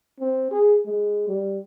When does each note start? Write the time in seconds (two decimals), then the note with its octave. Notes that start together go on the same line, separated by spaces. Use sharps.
0.20 C4
0.51 G#4
0.86 G#3
1.28 G3